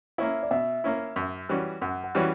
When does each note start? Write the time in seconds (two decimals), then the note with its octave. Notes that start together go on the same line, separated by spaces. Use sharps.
0.18 A#3 C#4 E4 E5
0.43 D5
0.51 B2 E5
0.84 A#3 C#4 E4
1.16 F#2
1.49 E3 G3 C#4 F#4
1.82 F#2 F#5
2.04 F#5
2.15 E3 G3 C#4 F#4